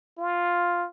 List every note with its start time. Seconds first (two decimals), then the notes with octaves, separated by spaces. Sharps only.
0.18 F4